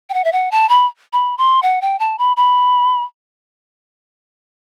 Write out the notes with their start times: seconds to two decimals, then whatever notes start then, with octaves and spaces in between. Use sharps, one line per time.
0.10 G5
0.14 F#5
0.24 E5
0.32 F#5
0.51 A5
0.69 B5
1.13 B5
1.38 C6
1.63 F#5
1.82 G5
2.00 A5
2.19 B5
2.37 B5